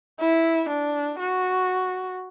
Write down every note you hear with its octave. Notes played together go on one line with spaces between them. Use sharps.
E4
D4
F#4